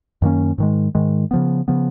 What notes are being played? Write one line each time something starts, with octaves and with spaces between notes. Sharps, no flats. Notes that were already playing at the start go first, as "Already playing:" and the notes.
F#2 D#3 A#3 C#4
G#2 D#3 G#3
G#2 D#3 G#3
C#3 F3 B3
C#3 F3 B3